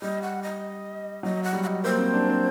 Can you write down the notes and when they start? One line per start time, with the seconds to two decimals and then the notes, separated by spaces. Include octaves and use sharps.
0.02 G3 D#5
0.22 F#5
0.43 D#5
1.23 F#3 D#5
1.43 F#5
1.53 G3
1.63 F#5
1.67 D#5
1.84 A#3 C5
1.99 C4
2.14 D4
2.30 C4